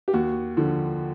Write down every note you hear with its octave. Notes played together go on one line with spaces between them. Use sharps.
G4
D#2 F#4
D3 F3